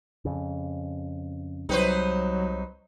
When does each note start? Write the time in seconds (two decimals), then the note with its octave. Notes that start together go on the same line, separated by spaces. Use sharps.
0.25 F2 C#3
1.69 C2 C3 F#3 G3 D#4 B4 C5